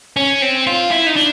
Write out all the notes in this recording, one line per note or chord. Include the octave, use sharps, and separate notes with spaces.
C#4
C4
F4
E4
D#4
D4